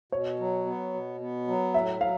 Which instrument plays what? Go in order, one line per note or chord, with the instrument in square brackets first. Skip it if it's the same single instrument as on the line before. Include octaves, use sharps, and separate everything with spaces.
[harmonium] B2 [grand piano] C#5
[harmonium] F#3
B3
B2
B3
F#3
[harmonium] A2 [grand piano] E5
[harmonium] F#3 [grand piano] F5